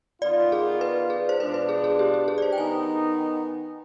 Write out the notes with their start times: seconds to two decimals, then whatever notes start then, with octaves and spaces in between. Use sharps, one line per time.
0.22 D#3 B3 F4 D5
0.52 G#4
0.81 B4
1.10 G#4
1.29 C5
1.40 B2 G#3 D4 F4 B4
1.54 B4
1.69 G#4
1.84 G#4
1.99 G4
2.14 G4
2.28 G#4
2.38 D5
2.42 C5
2.52 G5
2.58 D#3 B3 D#4 G#5